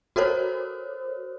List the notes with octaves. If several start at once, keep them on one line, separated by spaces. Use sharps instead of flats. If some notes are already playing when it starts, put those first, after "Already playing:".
F#4 A4 A#4 C5 C#5